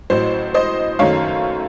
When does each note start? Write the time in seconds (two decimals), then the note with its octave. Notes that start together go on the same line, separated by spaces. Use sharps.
0.10 A1 A2 F#3 C5
0.54 C5 D#5
0.99 F#1 F#2 D#3 F#3 A3 C#5 F5